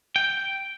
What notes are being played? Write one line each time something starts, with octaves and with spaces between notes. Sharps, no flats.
G5